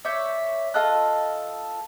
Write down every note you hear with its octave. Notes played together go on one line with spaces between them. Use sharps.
C#5 D5 E5 G6
F4 A4 D#5 F#6